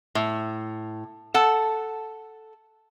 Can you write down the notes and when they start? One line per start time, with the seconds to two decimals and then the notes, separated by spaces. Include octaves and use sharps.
0.15 A2
1.34 A4 F#5 A5